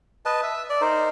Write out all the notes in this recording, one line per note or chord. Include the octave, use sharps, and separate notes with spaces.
B4 D#5 A5
E5
D5
D#4 A#4 C5